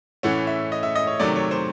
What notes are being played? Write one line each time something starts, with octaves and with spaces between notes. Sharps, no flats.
A2 E3 A3 C#4 F#5
E5
D#5
E5
D#5
C#5
C3 D#3 F#3 A3 D5
C#5
C5